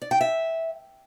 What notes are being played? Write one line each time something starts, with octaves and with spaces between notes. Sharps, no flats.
D5
G5
E5